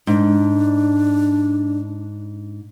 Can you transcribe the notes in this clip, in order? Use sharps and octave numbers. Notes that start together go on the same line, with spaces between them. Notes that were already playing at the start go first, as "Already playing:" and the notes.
G#2 D4